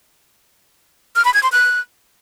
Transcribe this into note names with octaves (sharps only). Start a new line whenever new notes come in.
F6
B5
G#6
C6
F#6